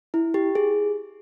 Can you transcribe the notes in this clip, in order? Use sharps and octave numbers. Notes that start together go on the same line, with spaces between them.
E4
G4
G#4